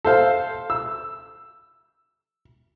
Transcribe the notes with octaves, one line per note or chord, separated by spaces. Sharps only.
A4 C5 F5
E6